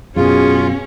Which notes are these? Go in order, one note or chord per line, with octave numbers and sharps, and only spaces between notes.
F#2 B2 C#4 F4 G#4